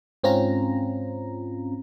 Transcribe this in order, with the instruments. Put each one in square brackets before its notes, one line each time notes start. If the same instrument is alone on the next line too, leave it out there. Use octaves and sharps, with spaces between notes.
[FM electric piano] G#2 C4 C#4 F4 A#5